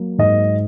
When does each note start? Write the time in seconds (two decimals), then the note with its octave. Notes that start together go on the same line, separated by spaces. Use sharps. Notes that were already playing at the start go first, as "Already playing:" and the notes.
Already playing: F#3 A#3
0.18 G#2 D#5